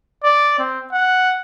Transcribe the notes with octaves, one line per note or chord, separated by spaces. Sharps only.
D5
C4
F#5